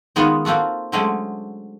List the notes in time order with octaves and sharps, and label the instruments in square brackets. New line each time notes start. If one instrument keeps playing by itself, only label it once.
[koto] D#3 G#3 B3 C#4 D#4 F4
A#3 C4 F4 F#4 A4
D3 F#3 G#3 A3 C4 C#4